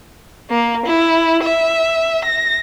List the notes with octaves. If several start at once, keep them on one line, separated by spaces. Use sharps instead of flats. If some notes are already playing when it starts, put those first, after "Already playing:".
A#3
E4
E5
A#6